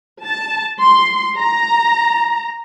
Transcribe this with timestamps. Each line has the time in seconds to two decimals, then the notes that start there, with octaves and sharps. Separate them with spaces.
0.24 A5
0.81 C6
1.36 A#5